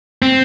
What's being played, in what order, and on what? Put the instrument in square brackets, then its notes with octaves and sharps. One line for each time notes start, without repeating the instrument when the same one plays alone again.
[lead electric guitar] C4